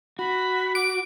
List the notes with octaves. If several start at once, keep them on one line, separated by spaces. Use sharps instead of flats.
F#4 B5
D6 D7